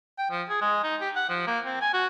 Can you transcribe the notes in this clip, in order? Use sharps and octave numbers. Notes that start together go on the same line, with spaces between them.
G5
F3
G#4
G#3
D#4
G4
F#5
F3
A#3
C4
G#5
F#4